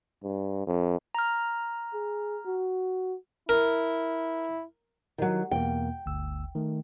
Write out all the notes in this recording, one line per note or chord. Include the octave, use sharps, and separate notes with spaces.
G2
F2
A#5 F6
G#4
F#4
E4 A#4
D#3 F#3
E2 B2 A#3 G5
G1 D2 E6
D#3 A3